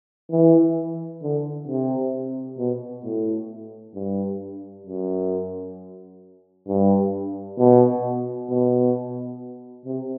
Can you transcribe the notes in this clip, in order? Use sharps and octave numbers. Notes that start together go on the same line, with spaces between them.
E3
D3
C3
B2
A2
G2
F#2
G2
B2
B2
C3